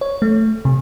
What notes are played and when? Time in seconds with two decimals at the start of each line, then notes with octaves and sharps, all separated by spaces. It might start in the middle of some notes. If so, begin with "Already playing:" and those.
0.01 C#5
0.22 A3
0.65 C3